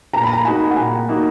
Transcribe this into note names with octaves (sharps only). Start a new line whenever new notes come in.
A#2 A#5
B5
A#5
A#3 D#4 F#4 G#5
F#5
A#2 G#5
A#3 D#4 F#4